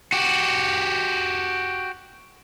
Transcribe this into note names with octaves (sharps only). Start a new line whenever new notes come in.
F#4 G4